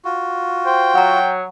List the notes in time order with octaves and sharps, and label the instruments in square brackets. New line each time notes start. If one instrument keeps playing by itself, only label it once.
[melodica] F4 F#4
[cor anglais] C5 [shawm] G5
[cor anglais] F#3 [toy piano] F#5 A#5